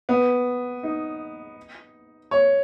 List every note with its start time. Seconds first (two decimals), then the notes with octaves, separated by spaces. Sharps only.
0.09 B3
0.83 D#4
2.31 C#5